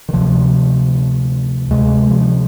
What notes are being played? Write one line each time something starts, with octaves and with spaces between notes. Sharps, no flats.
D#3
D2 C3 F3
D2 C3 G#3
F3